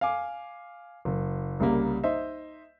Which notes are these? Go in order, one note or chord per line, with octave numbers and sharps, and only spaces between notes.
F5 G#5 D6
F#1
C2 C#3 G3 A#3
D#4 C5 D#5 E5